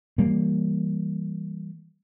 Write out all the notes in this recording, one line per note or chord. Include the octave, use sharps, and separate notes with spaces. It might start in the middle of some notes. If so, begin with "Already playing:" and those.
E3 G3 A#3